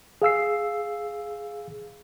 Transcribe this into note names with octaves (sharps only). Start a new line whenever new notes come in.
G#4 F5 E6 C7